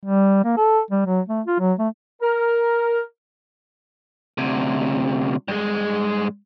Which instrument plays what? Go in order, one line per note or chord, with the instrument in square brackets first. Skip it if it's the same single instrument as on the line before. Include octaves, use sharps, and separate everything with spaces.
[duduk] G3
A#3
A4
G3
F#3
A3
F4
F#3
A3
[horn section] A#4
[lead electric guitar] D2 C3
G2 G#3